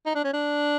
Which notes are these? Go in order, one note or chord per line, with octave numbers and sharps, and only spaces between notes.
D#4
D4
C#4
D4